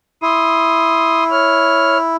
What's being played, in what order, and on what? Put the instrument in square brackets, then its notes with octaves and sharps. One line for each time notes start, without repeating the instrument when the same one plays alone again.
[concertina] E4 [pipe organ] C6 D#6
[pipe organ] C#5 F6